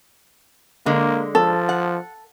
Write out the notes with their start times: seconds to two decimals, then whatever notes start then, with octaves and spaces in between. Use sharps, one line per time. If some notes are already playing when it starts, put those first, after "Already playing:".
0.86 D3 G#3 A#3
1.35 F3 A4
1.69 F#5